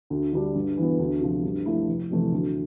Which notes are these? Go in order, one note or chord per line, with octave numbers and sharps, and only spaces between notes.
D2
D3 G3 D4
G2
E3 B3
D2
C3 F3
G2
F3 A3 E4
F1
F2 C3 E3 A3
D2